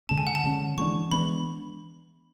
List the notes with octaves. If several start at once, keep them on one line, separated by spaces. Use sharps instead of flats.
D3 G#3 C#4 A5
G#5
F#5
A5
D3 G#3 C#4
E3 G#3 B3 D4 C#6
E3 G#3 B3 D4 B5